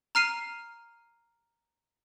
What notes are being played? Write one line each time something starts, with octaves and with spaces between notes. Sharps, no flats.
A#5 F6 C7 D#7